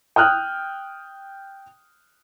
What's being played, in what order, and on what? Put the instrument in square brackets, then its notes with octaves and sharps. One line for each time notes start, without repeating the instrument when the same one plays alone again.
[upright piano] G5 D#6 F6 F#6